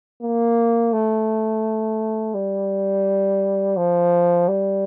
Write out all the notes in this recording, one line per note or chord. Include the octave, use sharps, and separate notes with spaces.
A#3
A3
G3
F3
G3